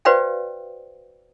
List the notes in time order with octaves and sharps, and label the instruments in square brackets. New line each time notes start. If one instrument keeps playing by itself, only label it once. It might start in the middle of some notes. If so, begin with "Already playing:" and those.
[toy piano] F#4 B4 C5 D5 F5 G5